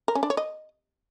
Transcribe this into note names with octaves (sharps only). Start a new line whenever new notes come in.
A#4
C#4
D4
C#5
D#5